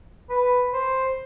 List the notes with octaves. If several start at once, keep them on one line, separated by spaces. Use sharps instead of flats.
B4
C5